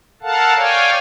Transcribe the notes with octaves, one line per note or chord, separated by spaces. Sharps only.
A4 A#4 F5 F#5 A5
C#5 D5 F5 G5 G#5